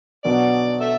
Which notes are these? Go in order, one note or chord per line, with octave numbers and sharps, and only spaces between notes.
B1 B2 F#3 B3 D4 D5
A4 E5